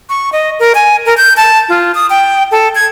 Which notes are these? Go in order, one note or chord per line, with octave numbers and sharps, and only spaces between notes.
C#6
D#5
A#4
G#5
A#4
G6
A5
F4
D#6
G5
A4
G#6